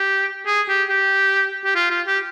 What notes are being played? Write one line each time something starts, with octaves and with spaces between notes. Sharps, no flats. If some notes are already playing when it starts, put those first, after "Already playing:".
Already playing: G4
G#4
G4
G4
G4
F4
F4
G4